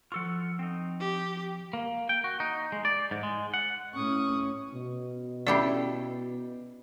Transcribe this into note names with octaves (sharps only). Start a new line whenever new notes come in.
F3 F4 A4 F#5 C#6
C4 D#4
G4
A#3
G5
F#4
D#4
G#3
D5
G#2
G#3
F#5
A2 C#4 C#6 D#6
B2
C#4 E4 G4 A4 D5